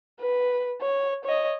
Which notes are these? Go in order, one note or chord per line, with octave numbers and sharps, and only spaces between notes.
B4
C#5
C#5 D#5